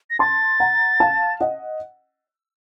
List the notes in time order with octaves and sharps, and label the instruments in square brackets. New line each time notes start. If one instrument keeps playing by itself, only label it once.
[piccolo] A#6
[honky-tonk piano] A5 C6 [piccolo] A6
[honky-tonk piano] F#5 A#5
F5 A5
D#5 F#5